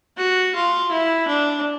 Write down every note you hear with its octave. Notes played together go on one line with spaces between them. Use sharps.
F#4
F4
E4
D4